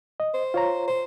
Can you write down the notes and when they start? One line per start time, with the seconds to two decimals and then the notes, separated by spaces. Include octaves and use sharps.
0.20 D#5
0.34 C5
0.54 F4 C#5 A#5
0.88 C5